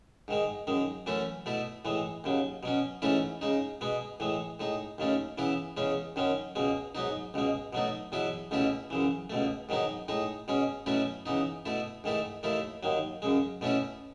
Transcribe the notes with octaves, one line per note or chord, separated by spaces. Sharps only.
G#2 D#3 G#3
F#2 D#3 G#3
F#2 E3 A3 C#4 E4
B2 A3 E4
A2 E3 G#3
D#2 C#3 F#3
B2 F#3 C#4
G#2 E3 A3 C#4 E4
C#3 G#3 D#4
B2 G#3 B3
A2 E3 G#3
A2 G#3 D#4
D#2 D#3 A3 C#4
C#3 E3 B3 E4
E2 C#3 G#3 C#4
F#2 D#3 F#3 C#4
C#2 B2 G#3
G#2 F#3 B3 D#4
C#2 B2 G#3
B2 F#3 A3 D#4
E2 B2 F#3 B3 E4
C#2 B2 A3 C#4 E4
F#2 C#3 E3
C#2 B2 A3
G#2 D#3 F#3 B3 D#4
A2 G#3 D#4
B2 G#3 C#4
B2 F#3 A3 C#4 E4
C#3 E3 B3 D#4
B2 A3 E4
G#2 D#3 A3 E4
D#2 D#3 A3 E4
D#2 D#3 F#3
F#2 C#3 G#3
B2 A3 C#4 E4